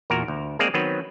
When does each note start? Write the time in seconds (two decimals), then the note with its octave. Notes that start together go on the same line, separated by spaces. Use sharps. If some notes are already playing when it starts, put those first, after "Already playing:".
0.10 E2 A#2 F#4 A#4
0.28 D2
0.59 G#3 A#3 C4 G#4 D5 F5
0.74 D#3 F#3 B3 C4 B4